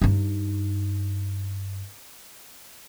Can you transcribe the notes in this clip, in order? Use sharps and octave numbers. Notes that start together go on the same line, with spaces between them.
G2 D#4